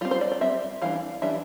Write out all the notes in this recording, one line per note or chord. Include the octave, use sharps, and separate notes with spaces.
G3 C4 F4
C5
D5
D5
G3 C4 E5
E3 G3 D4 F5
E3 G3 D4 E5